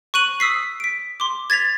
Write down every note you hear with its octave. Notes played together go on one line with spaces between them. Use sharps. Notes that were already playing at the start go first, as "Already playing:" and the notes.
C#6 F#6 D#7 F#7
D#6 E6 B6 C7
B6 D7
C6 D6
G#6 A6 B6 F7